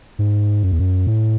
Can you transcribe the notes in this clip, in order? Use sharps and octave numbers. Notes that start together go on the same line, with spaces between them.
G#2
F#2
E2
F#2
A2